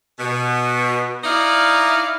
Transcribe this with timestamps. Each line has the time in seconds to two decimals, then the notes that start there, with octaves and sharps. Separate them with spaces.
0.18 B2
1.24 D#4 E4 D5 D#5 F5